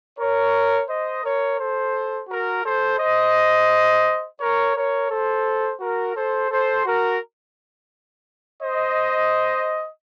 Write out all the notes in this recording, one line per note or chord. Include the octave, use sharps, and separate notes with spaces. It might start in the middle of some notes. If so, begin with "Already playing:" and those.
A#4 C#5
C5 D#5
A#4 C#5
A4 C5
F#4 A#4
A4 C5
C5 D#5
A#4 C#5
A#4 C#5
A4 C5
F#4 A#4
A4 C5
A4 C5
F#4 A#4
C5 D#5